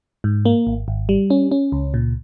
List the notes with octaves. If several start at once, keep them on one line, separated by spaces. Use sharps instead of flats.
G#2
A#3
G#1
G#1
G3
C#4
C#4
C#2
A#2